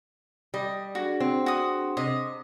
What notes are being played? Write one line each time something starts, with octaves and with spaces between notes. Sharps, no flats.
G3 D#5
D4 F#4 G#4 F#5
C4
F#4 D#6
C3 D#5